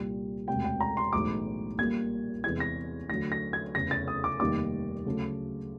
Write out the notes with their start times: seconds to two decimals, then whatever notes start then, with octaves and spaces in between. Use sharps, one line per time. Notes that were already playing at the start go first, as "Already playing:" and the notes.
Already playing: C2 A#2 G3
0.48 E1 D2 C3 G5
0.64 G5
0.80 A#5
0.97 C6
1.13 B1 A2 E3 G#3 D6
1.78 A#1 A#2 G3 A#3 G#6
2.44 E2 C3 E3 G#3 G#6
2.60 A#6
3.09 D2 D3 F#3 A#6
3.32 A#6
3.53 G#6
3.75 F1 E2 C#3 A#6
3.91 A6
4.08 D#6
4.24 D6
4.40 F1 D#2 D#3 G3 A#3 D6
5.05 D2 C#3 F#3 A3